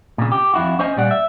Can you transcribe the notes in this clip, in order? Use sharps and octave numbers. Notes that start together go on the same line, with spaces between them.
A#2 C#3
G4
F2 E4 F#4
C#4 C5 D#5 G#5
A#2 G3 D5 F#5
E5